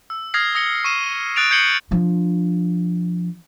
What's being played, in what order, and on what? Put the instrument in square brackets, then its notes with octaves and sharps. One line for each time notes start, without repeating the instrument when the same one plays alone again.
[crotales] E6
D#6 F6 G#6 A#6 C7
D#6 A#6 C#7 G7
C#6 C7 D#7 E7
D#6 F#6 A6 D7 F7
G6 G#6 C7 C#7 F#7 G7
[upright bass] F3 D4